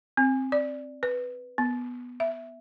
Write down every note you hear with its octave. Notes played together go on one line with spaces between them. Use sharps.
C4
D5
B4
B3
E5